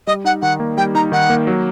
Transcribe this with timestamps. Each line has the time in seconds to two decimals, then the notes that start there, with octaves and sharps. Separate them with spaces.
0.07 G3 D#5
0.25 D#4 F#5
0.42 D#3 F#5
0.60 A#3
0.78 G3 G5
0.95 D#4 A#5
1.12 D#3 F#5
1.30 A#3
1.47 F#3